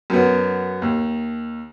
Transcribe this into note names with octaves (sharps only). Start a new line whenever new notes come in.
F#2 B2 B3
D#2